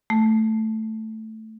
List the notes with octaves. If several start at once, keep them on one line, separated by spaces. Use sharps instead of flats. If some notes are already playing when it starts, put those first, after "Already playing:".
A3